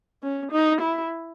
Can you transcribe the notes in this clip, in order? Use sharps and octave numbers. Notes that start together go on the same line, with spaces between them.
C#4
D#4
E4